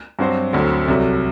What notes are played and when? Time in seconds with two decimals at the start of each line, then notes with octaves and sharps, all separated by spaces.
0.19 G2 F#3 C4 F#4 C5
0.53 D2 D3 F#3 C4
0.88 C2 C3 F#3